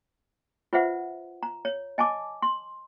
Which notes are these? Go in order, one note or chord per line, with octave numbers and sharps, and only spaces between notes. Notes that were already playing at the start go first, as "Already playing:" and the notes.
F4 B4 C5 E5 F#5
A#5
C#5
D#5 G#5 A5 D6
C6